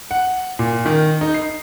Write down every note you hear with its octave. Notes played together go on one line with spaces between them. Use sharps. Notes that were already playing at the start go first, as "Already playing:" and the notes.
F#5
A#2
D#3
D#4
C7